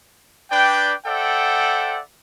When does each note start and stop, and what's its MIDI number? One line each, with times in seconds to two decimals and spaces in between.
0.51 0.93 62
0.51 0.93 71
0.51 0.93 74
0.51 0.93 79
1.06 2.00 69
1.06 2.00 72
1.06 2.00 74
1.06 2.00 76
1.06 2.00 78
1.06 2.00 79